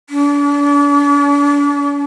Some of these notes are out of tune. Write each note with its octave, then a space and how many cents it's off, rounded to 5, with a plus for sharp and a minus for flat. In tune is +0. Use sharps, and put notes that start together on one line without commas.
D4 -40